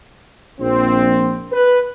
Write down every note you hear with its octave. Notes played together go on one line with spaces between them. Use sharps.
A#1 C4
B4